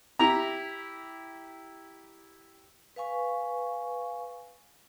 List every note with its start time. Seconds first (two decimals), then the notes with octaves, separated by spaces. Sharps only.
0.19 E4 G4 A#5
2.96 B4 F5 G#5 C#6